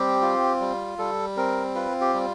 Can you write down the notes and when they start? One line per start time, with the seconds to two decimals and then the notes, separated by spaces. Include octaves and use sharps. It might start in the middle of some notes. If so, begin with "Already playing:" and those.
Already playing: G3 C4 G4
0.21 F4
0.60 G3
0.98 G3 A4
1.37 C4 A#4
1.75 F4 B4
2.01 G4
2.13 G3